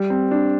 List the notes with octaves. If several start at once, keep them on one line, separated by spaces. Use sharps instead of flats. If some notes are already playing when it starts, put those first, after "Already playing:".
Already playing: G3
C4
D4